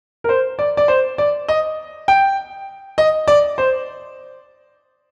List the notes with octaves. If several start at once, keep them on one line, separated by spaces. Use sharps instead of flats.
A#4
C5
D5
D5
C5
D5
D#5
G5
D#5
D5
C5